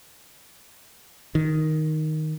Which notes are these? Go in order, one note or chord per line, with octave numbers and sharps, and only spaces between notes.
D#3